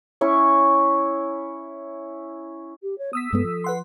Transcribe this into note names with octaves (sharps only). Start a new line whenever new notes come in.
C#4 E4 C#6
G4
C#5
B3 D#6 E6 B6
G2 G#3 B3 A4
F3
B4 F#5 C6